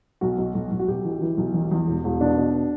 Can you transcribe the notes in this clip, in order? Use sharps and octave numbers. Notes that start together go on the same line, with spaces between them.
B1 F#4
B1
B1
B1
F#4
B1 G4
E3
E3
B1
E2
E2
E1
E1
B2 D4
B2